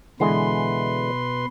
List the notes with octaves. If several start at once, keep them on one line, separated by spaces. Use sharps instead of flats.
B2 D3 E3 G#3 B4 C6